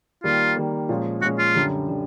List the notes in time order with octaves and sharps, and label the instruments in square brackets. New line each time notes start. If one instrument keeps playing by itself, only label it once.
[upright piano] D#3 G3 A#3 [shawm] F4
[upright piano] D#3 G3 A#3
A#2 F3 G#3 C#4
[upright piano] A#2 F3 G#3 C#4 [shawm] F#4
[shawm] F4
[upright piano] F#2 D3 G3
D3 G3